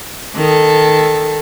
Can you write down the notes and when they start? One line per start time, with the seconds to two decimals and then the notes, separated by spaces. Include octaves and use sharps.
0.35 D#3 A4